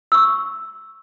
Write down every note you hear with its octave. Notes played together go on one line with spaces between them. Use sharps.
C#6 E6